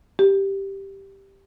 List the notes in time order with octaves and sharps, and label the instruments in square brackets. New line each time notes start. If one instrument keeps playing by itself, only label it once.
[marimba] G4